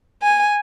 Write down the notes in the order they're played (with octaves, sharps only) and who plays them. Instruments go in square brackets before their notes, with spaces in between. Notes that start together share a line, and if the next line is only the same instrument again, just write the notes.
[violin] G#5